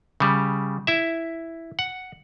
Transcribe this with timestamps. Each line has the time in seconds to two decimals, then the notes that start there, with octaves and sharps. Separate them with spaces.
0.20 C#3 G3
0.87 E4 E5
1.79 F#5